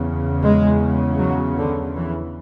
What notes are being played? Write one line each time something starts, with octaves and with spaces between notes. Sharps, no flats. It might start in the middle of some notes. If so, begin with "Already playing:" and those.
Already playing: E2 C#3
G#3
F#3
D3
E3